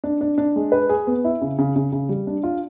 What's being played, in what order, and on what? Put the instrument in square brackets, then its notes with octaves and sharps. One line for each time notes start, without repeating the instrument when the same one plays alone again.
[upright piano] D4
D4
D4
G#3
B4
G#4
B3
E4
C#3
C#3
C#3
C#3
G3
D4
F4